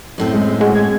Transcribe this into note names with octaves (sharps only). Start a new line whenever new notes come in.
F#2 A2 C4
G#3
G#3 F#4
G#6